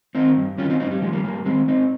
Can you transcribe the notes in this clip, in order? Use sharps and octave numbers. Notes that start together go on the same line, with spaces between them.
D#3 C4 D#4
G2
D#3 C#4 F4
C4 D#4
G2 C4 D#4
G3
D#3 F3 G#3
G3 A#3
G#2 G3 A#3
D#3 G#3 C4
G#2 C4 D#4